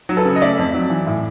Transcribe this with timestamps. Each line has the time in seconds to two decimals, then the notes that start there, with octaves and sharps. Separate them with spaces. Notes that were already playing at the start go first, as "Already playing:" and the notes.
0.09 F#3
0.17 A4 B4
0.25 C#3
0.36 D#5
0.42 A3 D5 E5
0.58 F2
0.74 F#3
0.90 E3
1.07 A2